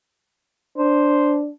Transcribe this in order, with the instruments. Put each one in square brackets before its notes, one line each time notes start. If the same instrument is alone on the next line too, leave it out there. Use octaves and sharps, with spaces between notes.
[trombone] D4 [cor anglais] C5